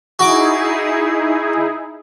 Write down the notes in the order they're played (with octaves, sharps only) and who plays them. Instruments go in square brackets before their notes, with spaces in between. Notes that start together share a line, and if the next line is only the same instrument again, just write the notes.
[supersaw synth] D#4 E4 G#4 [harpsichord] F#4 D6